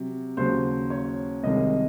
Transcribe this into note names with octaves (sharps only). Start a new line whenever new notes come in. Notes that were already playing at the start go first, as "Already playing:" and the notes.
Already playing: C3 F#3
D#2 C#3 F#3 C5
C#5
C2 C3 D#3 G#3 D#5